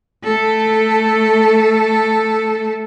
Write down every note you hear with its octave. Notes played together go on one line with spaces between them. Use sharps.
A3 A4